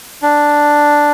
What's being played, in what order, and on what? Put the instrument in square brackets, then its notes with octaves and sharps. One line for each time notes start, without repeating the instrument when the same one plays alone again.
[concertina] D4